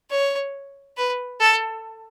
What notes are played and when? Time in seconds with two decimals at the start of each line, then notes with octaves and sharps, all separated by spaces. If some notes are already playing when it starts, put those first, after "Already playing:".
0.11 C#5
0.97 B4
1.41 A4